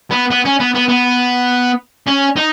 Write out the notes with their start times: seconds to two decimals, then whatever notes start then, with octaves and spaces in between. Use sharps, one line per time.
0.11 B3
0.31 B3
0.45 C#4
0.60 B3
0.75 B3
0.89 B3
2.07 C#4
2.36 D#4